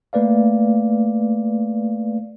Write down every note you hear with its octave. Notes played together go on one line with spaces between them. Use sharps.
A3 A#3 B4 D5 F5